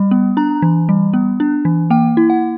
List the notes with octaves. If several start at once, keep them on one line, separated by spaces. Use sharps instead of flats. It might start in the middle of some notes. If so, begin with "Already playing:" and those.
Already playing: G3
B3
D4 A#5
E3
G3
B3
D4
E3
A#3 G5
E4
F#5